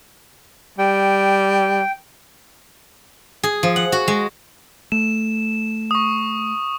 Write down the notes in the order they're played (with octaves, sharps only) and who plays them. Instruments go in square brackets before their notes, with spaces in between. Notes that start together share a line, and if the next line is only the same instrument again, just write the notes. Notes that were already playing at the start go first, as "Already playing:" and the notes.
[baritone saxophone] G3 [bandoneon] G5
[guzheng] G#4
F3
F#5
F#4
G#3
[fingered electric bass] A3 [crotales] E7
[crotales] C#6 D#6